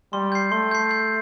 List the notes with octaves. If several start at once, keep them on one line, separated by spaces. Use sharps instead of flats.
G3 C6
G6 C7
A3 C6
G6 C7
G6